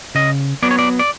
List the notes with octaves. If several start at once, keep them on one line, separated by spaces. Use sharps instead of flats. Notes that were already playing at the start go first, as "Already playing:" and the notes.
C#3 D#5
F#3 B3 D5
C#5
D5
D5